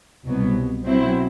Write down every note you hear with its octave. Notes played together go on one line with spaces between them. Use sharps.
C2 B2 F#3 B3
B2 F#3 C4 E4